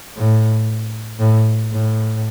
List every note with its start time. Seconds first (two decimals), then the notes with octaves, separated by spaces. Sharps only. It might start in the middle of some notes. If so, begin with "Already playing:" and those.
0.16 A2
1.19 A2
1.71 A2